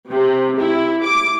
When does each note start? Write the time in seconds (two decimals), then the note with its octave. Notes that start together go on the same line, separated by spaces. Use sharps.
0.10 C3
0.58 E4
1.03 D6